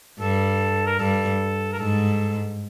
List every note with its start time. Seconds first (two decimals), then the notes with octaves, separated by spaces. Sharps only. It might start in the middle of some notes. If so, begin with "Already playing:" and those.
0.20 G2 A4
0.86 A#4
0.99 G2 A4
1.73 A#4
1.79 G#2 A4